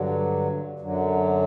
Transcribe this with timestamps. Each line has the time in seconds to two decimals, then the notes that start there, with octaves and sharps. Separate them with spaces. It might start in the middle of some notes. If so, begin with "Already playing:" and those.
Already playing: G2 D3 F#3
0.79 F#2 D3 F#3